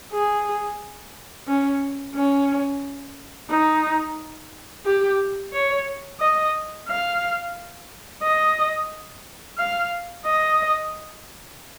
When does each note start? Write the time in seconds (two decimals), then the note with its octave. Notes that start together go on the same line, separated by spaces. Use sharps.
0.13 G#4
1.48 C#4
2.15 C#4
3.50 D#4
4.85 G4
5.53 C#5
6.20 D#5
6.88 F5
8.23 D#5
9.58 F5
10.25 D#5